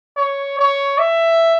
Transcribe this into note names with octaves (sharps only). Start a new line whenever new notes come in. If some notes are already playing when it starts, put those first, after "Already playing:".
C#5
C#5
E5